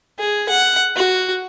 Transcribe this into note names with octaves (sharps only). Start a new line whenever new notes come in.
G#4
F#5
F#4